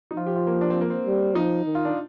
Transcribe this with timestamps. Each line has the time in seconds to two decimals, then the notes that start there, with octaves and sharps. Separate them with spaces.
0.11 D#4
0.16 F3 F4
0.26 G4
0.36 F4
0.47 A#3
0.61 D4
0.70 C4
0.81 A#3
0.90 C4
1.06 G3
1.35 F3 D#4
1.66 D#3
1.75 F4
1.85 D4